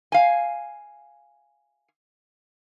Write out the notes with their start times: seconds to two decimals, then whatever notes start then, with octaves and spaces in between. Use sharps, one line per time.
0.12 F5 G#5